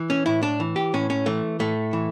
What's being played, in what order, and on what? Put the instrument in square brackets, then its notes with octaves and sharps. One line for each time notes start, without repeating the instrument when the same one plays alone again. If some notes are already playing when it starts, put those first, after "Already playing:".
Already playing: [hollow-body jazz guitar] E3
C#4
A2 E4
D4
E3
G4
A2 C#4
C#4
E3 A3
A2 A3
E3